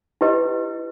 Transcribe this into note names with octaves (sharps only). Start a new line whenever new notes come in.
E4 G4 B4 D#5